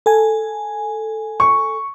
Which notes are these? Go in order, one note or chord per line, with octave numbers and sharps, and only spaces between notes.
A4 G#5
C#6